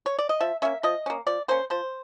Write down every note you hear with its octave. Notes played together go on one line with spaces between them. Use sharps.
C#5
D5
D#5
F3 E5
A#3 C#4 E5
F3 D#5
A#3 C#4
F3 D5
A#3 C#4 C5
F3 C5